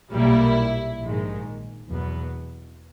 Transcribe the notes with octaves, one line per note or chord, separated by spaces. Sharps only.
B1 A#2 G3 A#3 E4
A#1 G#2 D#3 G#3
E2 B2 F#3 B3